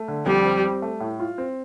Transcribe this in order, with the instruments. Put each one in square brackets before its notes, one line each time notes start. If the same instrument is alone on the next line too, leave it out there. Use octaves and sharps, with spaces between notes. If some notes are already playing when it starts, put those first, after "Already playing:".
Already playing: [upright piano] A3
D3
[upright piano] F2 [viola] G3
[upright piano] C4
C4
A3
A2
F4
C4